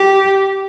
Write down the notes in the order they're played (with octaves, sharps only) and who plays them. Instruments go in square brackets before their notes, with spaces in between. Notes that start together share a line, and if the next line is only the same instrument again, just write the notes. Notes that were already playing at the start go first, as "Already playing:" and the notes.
Already playing: [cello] G4